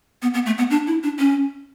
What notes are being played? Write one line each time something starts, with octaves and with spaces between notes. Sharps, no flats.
B3
B3
A3
B3
D4
E4
D4
C#4